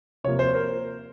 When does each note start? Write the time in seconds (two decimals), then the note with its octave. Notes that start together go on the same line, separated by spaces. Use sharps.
0.24 C3 F3 A#3 C#5
0.39 C5
0.55 A#4